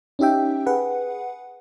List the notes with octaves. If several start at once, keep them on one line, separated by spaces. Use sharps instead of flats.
C#4 D#4 G4 E5 G5
G#4 B4 F#5